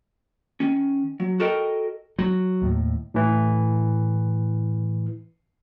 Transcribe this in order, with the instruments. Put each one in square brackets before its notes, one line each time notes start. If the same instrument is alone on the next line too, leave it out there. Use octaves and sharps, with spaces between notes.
[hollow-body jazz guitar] D#3 C#4
F#3
F#4 A4 A#4 D#5 G5
[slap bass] F#3
[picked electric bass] D#2 A2
[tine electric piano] A2 E3